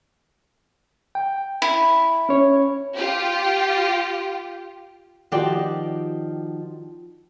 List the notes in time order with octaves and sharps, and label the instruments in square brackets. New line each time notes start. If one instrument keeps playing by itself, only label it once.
[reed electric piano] G5
[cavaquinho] E4
[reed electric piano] C#4 C#5
[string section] F4 G4
[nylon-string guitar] D#3 F3 F#4 G4 D5 G5